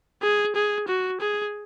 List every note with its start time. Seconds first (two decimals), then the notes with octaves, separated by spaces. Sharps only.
0.22 G#4
0.55 G#4
0.88 F#4
1.21 G#4